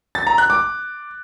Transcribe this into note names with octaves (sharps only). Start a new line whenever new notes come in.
A6
A#5
F#6
D6